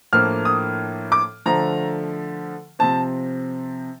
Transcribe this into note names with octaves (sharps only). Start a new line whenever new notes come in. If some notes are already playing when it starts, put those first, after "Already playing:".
A2 F3 A#3 D4 F6
D#6
D6
D3 F3 A3 A#5
C3 F3 C4 A5